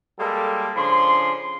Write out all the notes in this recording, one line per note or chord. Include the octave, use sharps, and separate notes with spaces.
G3 G#3 A#3 A4
C#3 F3 D4 C6